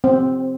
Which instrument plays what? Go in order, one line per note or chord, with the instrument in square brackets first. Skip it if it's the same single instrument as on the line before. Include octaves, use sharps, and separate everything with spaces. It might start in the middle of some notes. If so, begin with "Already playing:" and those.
[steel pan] C4